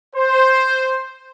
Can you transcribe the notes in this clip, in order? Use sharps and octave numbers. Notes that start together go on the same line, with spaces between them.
C5